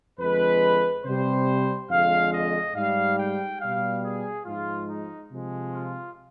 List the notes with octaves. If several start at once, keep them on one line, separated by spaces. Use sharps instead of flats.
F2 D3 G#3 B4
C3 G3 C5
F2 D3 G#3 F5
D#5
G#2 G3 F5
G5
B2 G3 F5
G#4
G#2 F3 G#3 F4
D#4
C3 F3 G#3
F4